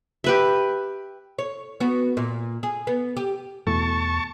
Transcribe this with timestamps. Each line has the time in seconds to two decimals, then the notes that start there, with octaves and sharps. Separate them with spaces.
0.24 G4 B4 E5
1.39 C#5
1.80 B3 F#4
2.17 A#2
2.63 G#4
2.87 B3
3.17 G4
3.67 E2 B2 E3 A3 A5 C#6